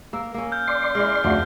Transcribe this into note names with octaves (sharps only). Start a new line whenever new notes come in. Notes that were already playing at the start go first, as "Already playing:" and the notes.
A#3 A#4 E6
A#3 C#4
F6 G6
D5 C6
G#3 E4 F6
F1 D2 F3 F#4 E5